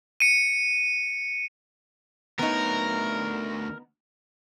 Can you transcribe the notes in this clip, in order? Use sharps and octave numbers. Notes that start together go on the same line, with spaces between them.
C#7 D#7
D2 B3 D#4 A#4 C#5